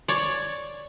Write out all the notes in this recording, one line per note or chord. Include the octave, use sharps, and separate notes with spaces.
C#5 D5